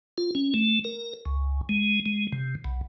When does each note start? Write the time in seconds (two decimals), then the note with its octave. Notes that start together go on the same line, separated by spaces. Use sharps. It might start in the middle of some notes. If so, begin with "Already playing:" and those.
0.18 F4
0.35 C#4
0.54 A3
0.84 A#4
1.26 C#2
1.69 G#3
2.06 G#3
2.32 C3
2.64 B1